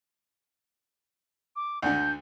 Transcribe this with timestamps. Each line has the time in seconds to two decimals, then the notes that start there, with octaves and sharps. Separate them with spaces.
1.56 D6
1.82 D2 D3 G6